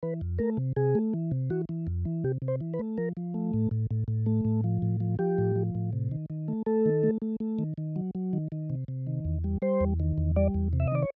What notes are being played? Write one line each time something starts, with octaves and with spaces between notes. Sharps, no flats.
E3 B4
F2
A3 A#4
C3
C3 G#4
A3
E3
C3
E3 F#4
E3
F2
E3
C3 G4
C3
C5
E3
B4
A3
F3 A#4
F3
A3
A2
A2
A2
A2
A3
A2
F3
A2
F3
F3 G4
A2
F3
A2
C3
D#3
D#3
A3
A3 A4
D#3
A3
A3
A3
D#3
D#3
F#3
F#3
D#3
D#3
C3
C3
D#3
E2
G3
G3 C5
E2
D#3
E2
G3 D5
E2
C3
E5
D#5
D#3 D5
C#5